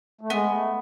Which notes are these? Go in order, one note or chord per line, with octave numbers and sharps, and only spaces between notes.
A3
G#3 B3
A3